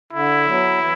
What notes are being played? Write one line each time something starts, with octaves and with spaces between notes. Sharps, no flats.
D3 E4
F#3 B3
E3